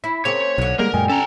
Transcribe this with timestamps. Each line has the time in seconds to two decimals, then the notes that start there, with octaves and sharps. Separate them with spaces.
0.04 E4 B6
0.25 C#3 A#3 C4 C#5
0.58 B1 B2 D3
0.79 G3 G#3 A#3 A#4
0.94 F#2 A#2 G#3 G5 G#5
1.10 C#4 A4 A#5